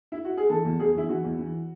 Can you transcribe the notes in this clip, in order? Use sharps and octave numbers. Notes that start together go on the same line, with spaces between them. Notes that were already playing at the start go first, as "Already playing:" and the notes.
E4
F#4
G#4
E3 A4
E2
E2 G#4
E2 E4
E3 F#4
E2
E3